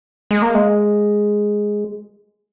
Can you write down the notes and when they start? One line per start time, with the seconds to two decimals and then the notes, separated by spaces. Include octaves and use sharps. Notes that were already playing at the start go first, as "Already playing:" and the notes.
0.31 G#3
0.42 A#3
0.54 G#3